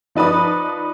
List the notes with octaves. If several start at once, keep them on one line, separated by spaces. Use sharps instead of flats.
F3 D#4 B4 D5 D#6